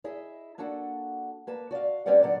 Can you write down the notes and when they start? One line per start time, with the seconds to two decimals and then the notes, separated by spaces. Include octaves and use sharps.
0.04 E4 G#4 D#5 E5
0.58 A#3 D4 F#4 A4 F#5
1.47 A#3 B4 A5
1.71 F#4 D5 D#5 F5
2.06 G3 C4 C#4 B4 D5 F#5
2.23 A#2 D3 F#3 D5 F#5